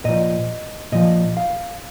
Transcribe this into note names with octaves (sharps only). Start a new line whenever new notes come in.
A#2 F3 D#5
A#2 F3 D#5
F5